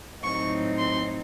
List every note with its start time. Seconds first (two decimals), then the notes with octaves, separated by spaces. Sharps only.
0.24 A2 F#3 C4 D#4 C#6
0.78 C6